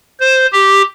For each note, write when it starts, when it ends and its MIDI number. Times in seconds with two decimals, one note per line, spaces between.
0.20 0.46 72
0.52 0.82 67